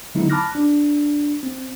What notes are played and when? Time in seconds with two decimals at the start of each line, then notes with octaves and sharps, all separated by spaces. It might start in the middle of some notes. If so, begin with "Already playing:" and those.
0.15 D3 F#3 G#3 B3 D#4 E4
0.30 A5 B5 D6 F6 F#6 A#6
0.55 D4
1.43 C4